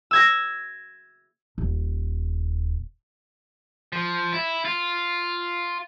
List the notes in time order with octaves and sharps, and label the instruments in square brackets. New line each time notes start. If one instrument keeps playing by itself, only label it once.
[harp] E6 G#6 A#6
[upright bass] D#1
[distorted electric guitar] F3
E4
F4